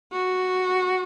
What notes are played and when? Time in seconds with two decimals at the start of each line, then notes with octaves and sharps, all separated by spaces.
0.13 F#4